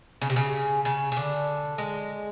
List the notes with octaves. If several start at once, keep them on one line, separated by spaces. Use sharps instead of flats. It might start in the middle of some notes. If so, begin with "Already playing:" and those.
C#3
C3
C#3
C#3
C#3
D3
G#3